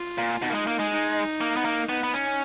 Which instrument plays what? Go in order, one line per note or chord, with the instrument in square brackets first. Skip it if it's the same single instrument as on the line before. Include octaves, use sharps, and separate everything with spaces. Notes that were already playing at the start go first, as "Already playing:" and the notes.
Already playing: [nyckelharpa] F4
[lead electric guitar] A#2
[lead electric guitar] B2 [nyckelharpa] D#4
[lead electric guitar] A#3
G#3
A#3
G#3
[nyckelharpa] D#4
[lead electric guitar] A#3
B3
A#3
[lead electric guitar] B3 [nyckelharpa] D#4
[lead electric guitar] B3
C#4